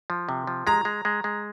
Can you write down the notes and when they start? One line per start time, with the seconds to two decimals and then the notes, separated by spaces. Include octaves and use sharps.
0.10 F3
0.29 C3
0.47 F3
0.67 G#3 A#5
0.85 G#3
1.05 G#3
1.24 G#3